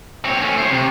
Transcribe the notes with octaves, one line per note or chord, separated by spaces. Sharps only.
C4 C#5
A3 C#4
C5 C#5
C3